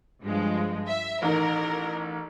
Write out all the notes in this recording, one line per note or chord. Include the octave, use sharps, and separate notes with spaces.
G2 F3 G#3
E5
A1 D#3 A#4